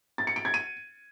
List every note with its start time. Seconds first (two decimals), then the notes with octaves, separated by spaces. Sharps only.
0.18 A6
0.27 C#7
0.36 D7
0.45 G#6
0.54 D#7